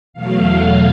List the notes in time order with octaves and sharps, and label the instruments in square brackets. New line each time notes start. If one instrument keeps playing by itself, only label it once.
[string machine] E2 B2 F#3 A3 F5